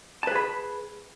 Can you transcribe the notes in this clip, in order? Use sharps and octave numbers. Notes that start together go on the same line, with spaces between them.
G#4 B4 A5 B5